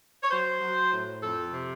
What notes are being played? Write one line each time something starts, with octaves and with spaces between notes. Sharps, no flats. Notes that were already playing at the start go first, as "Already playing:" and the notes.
C#5
F#3 C5
F#3
A2
F2 A4
C3